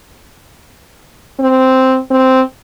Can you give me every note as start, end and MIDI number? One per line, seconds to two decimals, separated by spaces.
1.40 2.00 60
2.11 2.42 60